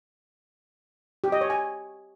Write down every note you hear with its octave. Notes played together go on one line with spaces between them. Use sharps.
G4
D#5
C#5
G#5